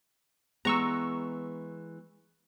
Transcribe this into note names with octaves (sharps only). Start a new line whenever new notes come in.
E3 G#3 B3 A#5 C#6 E6